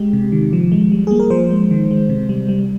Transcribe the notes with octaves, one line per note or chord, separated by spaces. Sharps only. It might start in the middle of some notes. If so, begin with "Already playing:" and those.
Already playing: G#3 G4
C3
D#3
F3
G#3
G3
A#3 G#4
A#4
F3 C5
G#3
D#3
G#3
C3
G3
G3